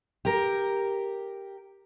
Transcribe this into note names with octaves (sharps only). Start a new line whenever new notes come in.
G4 A#4